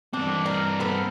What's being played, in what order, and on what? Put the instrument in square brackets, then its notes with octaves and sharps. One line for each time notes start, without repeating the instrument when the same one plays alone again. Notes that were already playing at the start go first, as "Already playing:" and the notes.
[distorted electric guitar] G2 C4 [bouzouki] D4
[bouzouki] A#4
B3 A4 A#4